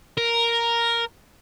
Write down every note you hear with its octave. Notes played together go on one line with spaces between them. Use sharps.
A#4